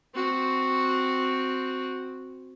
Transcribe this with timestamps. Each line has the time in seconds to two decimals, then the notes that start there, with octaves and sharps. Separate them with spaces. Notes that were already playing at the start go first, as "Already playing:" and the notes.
0.15 C4 F#4